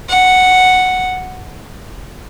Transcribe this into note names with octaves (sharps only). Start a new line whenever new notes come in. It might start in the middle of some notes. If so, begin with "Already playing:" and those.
F#5